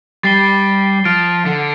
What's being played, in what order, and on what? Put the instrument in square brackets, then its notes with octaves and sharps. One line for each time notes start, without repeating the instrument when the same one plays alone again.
[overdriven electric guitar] G3 [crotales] A6 C7 G7
[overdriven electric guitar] F3 [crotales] F6 A6 D7 F7
[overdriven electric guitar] D3